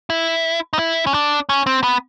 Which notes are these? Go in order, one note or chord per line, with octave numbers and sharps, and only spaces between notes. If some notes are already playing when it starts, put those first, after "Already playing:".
E4
D#4
E4
C#4
D4
C#4
C4
B3